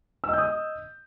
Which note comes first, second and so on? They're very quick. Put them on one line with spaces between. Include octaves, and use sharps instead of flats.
E6 D#5 G6 D#6